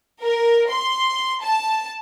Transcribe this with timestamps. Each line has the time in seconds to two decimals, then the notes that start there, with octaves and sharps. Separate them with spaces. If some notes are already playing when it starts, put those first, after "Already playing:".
0.22 A#4
0.71 C6
1.41 A5